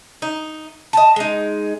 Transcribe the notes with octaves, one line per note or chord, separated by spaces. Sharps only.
D#4
D#5 A5
G#3 D#4